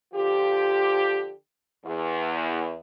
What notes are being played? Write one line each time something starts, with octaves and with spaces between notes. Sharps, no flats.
D3 F3 F4 G4
E2